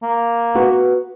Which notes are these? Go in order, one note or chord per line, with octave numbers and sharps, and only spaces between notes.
A#3
B3 F#4 B4